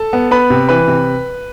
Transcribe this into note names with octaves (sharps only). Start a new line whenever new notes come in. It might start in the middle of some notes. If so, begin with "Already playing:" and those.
Already playing: A4 A5
B3
B3 B4 B5
C3
E3 B4 B5
C3